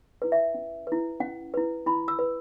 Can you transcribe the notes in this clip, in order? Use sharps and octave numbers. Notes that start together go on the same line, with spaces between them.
E4 B4
E5
C#4
E4 B4
C#4 F#5
E4 B4
E4 B5
E6
B4